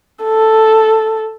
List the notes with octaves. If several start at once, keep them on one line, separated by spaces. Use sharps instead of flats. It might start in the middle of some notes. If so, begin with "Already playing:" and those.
A4